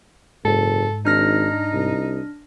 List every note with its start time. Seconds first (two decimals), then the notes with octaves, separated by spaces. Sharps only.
0.45 F#1 G#2 A4
1.05 G#1 D4 D#4 F6 A#6
1.73 C2